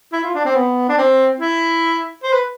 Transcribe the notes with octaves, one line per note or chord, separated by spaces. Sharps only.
E4
F4
D4
C4
B3
D4
C4
E4
C5
B4